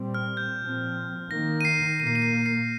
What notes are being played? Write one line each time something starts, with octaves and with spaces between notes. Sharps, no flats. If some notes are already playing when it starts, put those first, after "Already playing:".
Already playing: A#2 G3 C4
F6
G6
A#2 F3 C4
D#3 A#3 A#6
D#7
C7
A#2 A#3 D#7
C7
D#7
C7
C7